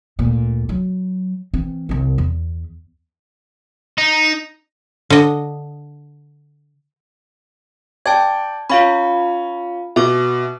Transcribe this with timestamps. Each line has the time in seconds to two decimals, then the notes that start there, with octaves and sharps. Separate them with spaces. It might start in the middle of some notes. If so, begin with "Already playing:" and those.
0.19 D2 A#2
0.69 F#3
1.54 E3 C4
1.89 C2 C4
2.18 E2
3.98 D#4
5.10 D3 D#5
8.06 D5 G5 A5 G#6
8.70 C#4 F4 F5 B5
9.96 B2 E5 D6